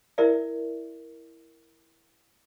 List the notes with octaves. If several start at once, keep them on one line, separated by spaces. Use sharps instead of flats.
E4 A#4 D5 E5